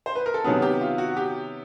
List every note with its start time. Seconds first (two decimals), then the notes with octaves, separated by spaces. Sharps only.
0.06 C5
0.15 B4
0.26 A#4
0.34 A4
0.44 C3 D#3 F#3 B3 G#4
0.62 G4
0.81 F4
0.98 F#4
1.17 G4